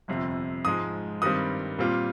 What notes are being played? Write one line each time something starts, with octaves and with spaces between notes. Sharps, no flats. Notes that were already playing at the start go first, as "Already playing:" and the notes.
G1 F2 C3
G#2 F3 G#3 D#6
G2 D#3 G3 C4 D#6
A#2 G3 C4 F4